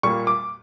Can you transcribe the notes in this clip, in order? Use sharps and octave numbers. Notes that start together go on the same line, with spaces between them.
A#2 G3 A#3 C#6
D6